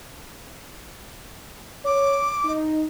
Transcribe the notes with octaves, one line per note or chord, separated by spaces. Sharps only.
C#5 D6
D#4